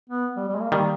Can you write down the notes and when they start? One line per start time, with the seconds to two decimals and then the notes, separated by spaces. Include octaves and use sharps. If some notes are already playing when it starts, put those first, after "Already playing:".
0.10 B3
0.37 G3
0.48 G3
0.55 G#3
0.60 A#3
0.72 D#3 G3